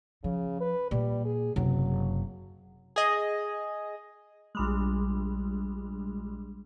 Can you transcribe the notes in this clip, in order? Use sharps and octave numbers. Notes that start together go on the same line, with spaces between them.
C#3 F3
B4
A#2 G3
G#4
F#1 C3 F#3
G#4 D#5
A#1 G3 G#3